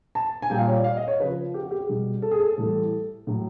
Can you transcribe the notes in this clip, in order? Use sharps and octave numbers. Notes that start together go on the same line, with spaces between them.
A5
G#5
A#2 G3 G5
F5
C#5
D5
F5
D#5
C#5
C#3 F3 B4
G4
F#4
G4
G#4
B2 G3
A4
G#4
A4
A2 E3 G3 A4
A2 F#3